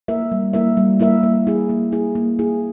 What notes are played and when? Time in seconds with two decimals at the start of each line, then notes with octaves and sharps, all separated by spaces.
0.08 A#3 E4 A#4 E5
0.32 G3
0.53 A#3 E4 A#4 E5
0.77 G3
1.00 A#3 E4 A#4 E5
1.23 A#3
1.47 E4 G#4
1.70 A#3
1.92 E4 G#4
2.15 A#3
2.39 E4 G#4